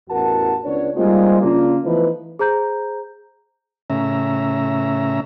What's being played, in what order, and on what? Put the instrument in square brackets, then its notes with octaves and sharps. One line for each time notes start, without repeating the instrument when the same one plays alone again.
[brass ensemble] A1 E2 F#4 A#4 F#5 A5
C#2 B3 D4 C#5
G3 G#3 A#3 C4 D#4 F4
C#3 A#3 D4 F4
E3 F3 A3 B3 D#4 B4
[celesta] G#4 C5 A#5 G6
[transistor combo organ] A2 C#3 C#4 E5 A#5